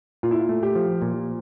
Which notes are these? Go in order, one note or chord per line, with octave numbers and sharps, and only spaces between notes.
A#2 F4
E4
F4
A3
G4
F3
A#2